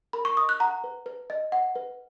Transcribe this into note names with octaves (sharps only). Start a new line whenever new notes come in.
A#4 B5
C#6
D#5 D#6
F#6
F#5 A#5
B4
B4
D#5
F#5
B4